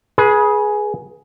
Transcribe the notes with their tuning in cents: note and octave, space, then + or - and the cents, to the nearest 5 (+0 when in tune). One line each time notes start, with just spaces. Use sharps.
G#4 +10 B4 -30